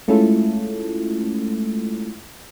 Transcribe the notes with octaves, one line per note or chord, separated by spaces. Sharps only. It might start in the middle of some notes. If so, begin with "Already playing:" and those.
G#3 A3 C#4 E4 F4 A4